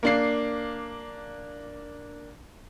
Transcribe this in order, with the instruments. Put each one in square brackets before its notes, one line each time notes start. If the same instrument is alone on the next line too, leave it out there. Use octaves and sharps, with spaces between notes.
[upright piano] A#3 D4 C7